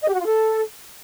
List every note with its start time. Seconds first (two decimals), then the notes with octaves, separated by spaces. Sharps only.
0.01 D#5
0.07 G4
0.14 F#4
0.20 F4
0.26 A4